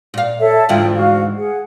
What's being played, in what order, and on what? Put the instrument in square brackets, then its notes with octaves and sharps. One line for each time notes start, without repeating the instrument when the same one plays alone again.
[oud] A#2 F5
[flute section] A4 C#5 E5
[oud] D2 G#2 E3 [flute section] F4 G5
[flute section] F#4 F5
G#4 F#5